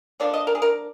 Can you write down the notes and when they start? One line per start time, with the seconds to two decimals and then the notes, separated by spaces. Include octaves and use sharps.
0.20 D3 F3 A#3 D4 D5
0.33 D#5
0.47 A#4
0.55 G#4
0.62 A#4